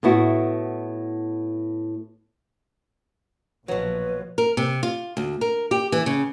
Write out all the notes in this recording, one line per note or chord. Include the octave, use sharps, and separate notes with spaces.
A2 B3 E4 F#4
A#1 B2 F3 F#3 B4
A#4
C3
F4
D2
A#4
G4
E3
C#3